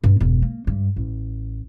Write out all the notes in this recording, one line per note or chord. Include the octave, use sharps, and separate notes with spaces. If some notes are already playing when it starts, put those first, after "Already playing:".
G2
E1
A#3
G2
A1